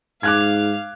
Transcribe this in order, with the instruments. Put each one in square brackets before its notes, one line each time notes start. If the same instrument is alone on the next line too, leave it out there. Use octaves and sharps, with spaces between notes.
[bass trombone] G#2 [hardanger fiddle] F5 [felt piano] D6 F#6 G#6